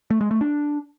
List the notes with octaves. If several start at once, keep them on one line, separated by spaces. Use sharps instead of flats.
A3
G#3
A3
D4